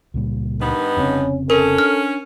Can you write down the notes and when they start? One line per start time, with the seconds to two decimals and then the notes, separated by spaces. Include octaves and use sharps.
0.14 C#2 A#2 G3
0.60 G2 D#3 B3 D#4
0.97 F1 C#3 C4 C#4
1.50 C#4 A4 A#4
1.78 D4 F6